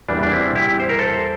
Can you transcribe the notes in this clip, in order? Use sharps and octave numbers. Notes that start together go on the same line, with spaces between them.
E2 E3 G3 A#3 D4
D4
C4 E4
E4 G4
C5
A#4
A4 C5